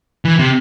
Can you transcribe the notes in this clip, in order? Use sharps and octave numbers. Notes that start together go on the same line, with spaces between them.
E3
C3